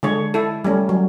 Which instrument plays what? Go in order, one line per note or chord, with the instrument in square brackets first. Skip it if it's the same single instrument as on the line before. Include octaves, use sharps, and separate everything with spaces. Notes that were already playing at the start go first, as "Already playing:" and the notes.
[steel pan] D3 G#3 C#5
E4 A4
G3 A3 C#4
F#3